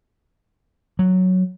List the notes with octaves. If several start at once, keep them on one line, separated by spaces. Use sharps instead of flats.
F#3